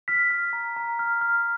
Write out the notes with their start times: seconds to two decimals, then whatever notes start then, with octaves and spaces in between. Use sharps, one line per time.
0.08 F6 B6
0.30 F6
0.53 A#5
0.76 A#5
0.99 F6
1.21 F6